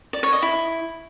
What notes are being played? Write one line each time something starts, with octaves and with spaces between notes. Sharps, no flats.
D5
C#5
D#5
E4